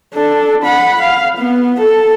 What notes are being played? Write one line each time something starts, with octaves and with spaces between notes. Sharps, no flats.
D4 A4
F#5 B5
F5
B3
A4